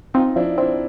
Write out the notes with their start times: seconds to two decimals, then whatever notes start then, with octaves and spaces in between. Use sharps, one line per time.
0.14 C4 D#4 F4
0.36 F3 D4 E4
0.58 C4 D4 E4